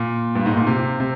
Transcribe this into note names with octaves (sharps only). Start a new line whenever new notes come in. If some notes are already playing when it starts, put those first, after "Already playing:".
Already playing: A#2
G2
G#2
A#2
C3
C3